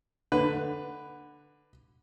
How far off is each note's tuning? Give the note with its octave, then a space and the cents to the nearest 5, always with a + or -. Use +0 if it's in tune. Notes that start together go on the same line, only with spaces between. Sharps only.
D3 +10 B4 +10